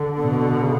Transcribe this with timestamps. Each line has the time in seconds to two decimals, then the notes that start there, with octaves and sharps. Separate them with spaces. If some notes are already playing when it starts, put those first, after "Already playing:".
Already playing: D3
0.20 B2
0.64 C#3